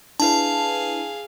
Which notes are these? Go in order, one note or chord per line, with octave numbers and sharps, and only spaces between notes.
D4 E4 G#4 B4 F5 A5